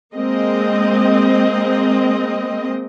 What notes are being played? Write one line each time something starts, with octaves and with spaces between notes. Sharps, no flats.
G#3 A#3 C4 D#5